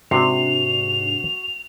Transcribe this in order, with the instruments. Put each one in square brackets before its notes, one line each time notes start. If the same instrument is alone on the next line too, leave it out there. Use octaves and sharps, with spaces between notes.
[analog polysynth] G#2 D4 [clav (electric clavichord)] C3 C4 [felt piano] F#4 C7 [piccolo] F7